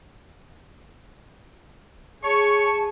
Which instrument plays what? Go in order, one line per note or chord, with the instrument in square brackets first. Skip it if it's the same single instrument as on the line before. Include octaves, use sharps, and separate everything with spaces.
[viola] G#4 [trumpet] C#5 [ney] A5 [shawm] C#6